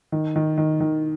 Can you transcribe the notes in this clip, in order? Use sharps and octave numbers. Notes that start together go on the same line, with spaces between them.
D#3
D#3
D#3
D#3